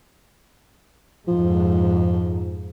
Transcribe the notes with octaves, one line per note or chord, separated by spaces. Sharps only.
F2 G#2 F3